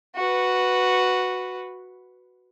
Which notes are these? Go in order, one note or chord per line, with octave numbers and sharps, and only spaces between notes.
F#4 B4